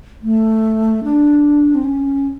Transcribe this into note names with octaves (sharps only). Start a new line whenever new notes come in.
A3
D4
C4
C#4